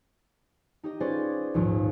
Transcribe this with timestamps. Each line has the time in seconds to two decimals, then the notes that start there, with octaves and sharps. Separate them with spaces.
0.83 D#4 G4 D#5
1.00 C#4 F4 G#4 B4 C5 D5
1.54 A#1 D#2 G#2 F3